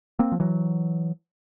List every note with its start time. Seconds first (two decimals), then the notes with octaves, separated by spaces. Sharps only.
0.19 A#3 C4
0.32 F3
0.40 E3 F#3